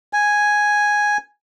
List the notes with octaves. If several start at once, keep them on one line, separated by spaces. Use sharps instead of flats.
G#5